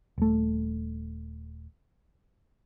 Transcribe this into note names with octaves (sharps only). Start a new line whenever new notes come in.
D#1 A3